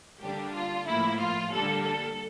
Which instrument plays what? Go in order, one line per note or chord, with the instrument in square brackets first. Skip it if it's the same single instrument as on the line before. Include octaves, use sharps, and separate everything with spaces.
[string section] D3 G3 A#3 D4 G4
F4
A2 F3 A#3 E4
F4
D3 G3 A#3 D4 A4
A4